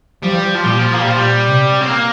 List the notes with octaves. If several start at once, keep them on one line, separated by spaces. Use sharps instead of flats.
F3 G3
F3
A#2 G3
F3
A#3
G3
A#2 F3
G3
C3
C4
A#3